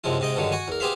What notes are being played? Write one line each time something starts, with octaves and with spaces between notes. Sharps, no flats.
F#2 C3 F3 G#3 E4
G#2 C3 D#5 G5
G2 D3 D#3 F#3 G#3
F#4 F#5 G#5
E2 A#4
B3 G4 G#4 C5 E5 F5